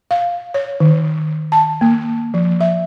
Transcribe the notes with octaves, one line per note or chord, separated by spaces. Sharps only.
F5
C#5
D#3
A5
A#3
F3
E5